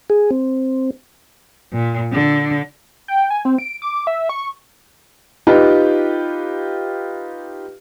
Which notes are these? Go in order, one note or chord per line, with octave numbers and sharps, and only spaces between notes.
G#4
C4
A#2
D3
G5
G#5
C4
D7
D6
E5
C#6
D#4 F4 G4 B4